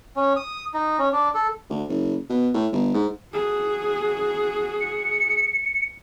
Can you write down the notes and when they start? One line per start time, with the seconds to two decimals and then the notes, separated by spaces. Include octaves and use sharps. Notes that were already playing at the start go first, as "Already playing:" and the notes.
0.16 C#4
0.36 D#6
0.74 D#4
0.99 C#4
1.13 D4
1.35 A4
1.70 D2
1.89 F#1
2.29 B2
2.54 A2
2.72 G1
2.94 G#2
3.33 F#4 G#4
4.81 C#7